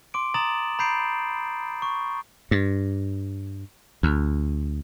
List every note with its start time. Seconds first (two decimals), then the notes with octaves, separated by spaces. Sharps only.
0.14 C6 D6 D7
0.34 A#5 D#6 A6 E7 F#7
0.79 A#5 B5 G6 C7 D7
1.82 C#6
2.51 G2
4.03 D2